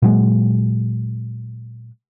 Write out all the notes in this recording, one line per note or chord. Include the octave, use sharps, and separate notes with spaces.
A#2 F#3 G#3